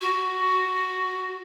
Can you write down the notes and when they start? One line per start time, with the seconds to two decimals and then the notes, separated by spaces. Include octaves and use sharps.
0.01 F#4